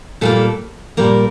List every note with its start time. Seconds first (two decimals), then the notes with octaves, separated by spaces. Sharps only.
0.21 A#2 G3 A#3 A4
0.97 A#2 G3 A#3 A#4